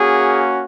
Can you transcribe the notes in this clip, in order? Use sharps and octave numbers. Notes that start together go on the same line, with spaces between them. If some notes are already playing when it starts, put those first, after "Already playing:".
Already playing: A#3 C#4 F#4 G#4